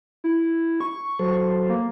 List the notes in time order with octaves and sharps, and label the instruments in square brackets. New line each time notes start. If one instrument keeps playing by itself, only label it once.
[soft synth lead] E4
C#6
[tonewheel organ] F#3 A4 C5
[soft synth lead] A#3